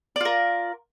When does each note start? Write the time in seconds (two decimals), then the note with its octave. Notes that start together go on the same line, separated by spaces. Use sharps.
0.16 D5
0.21 F4
0.25 A#4